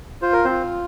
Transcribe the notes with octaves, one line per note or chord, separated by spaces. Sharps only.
F4 C5
A#4
C4 C5
F4